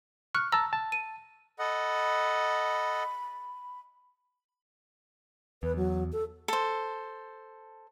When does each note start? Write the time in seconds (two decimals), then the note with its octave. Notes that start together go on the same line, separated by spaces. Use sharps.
0.35 C#6 F6 F#6
0.52 A5 A#5 E6
0.73 A5
0.92 D#7
1.59 A4 D#5 F#5 B5
5.63 E2 B4
5.76 F#3
6.12 A4
6.48 A4 C5